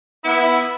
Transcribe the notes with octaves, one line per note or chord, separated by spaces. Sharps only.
B3 E4